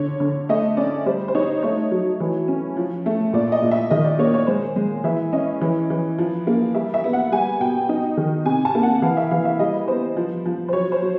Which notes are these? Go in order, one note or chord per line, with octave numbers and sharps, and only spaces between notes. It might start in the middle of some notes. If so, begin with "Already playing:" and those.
Already playing: D3 C#5
D3
A3 D#5
C#4 D5
G3 C5
C5
D#4 C#5
A3 C#5
F#3
E3
C#4
F3
A3
A#2 D5
D#5
A#2
E5
D#3 D#5
D5
A#3 C#5
C#5
G#3 C5
G#3
E3 E5
C#4 D#5
E3
E3
F3
A#3
G3 E5
E5
B3
F#5
G3 G#5
B2 G5
D#4
D#3
C3 G#5
A5
A#3
F#5
E3 F5
E5
E3 F5
E5
G3 D#5
B3 C5
F3
F3
C5
F#3 C#5
C5
F#3